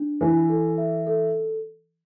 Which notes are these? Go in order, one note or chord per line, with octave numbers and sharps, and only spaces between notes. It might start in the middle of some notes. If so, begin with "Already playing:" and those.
Already playing: D4
E3 G#5
A4
E5
A4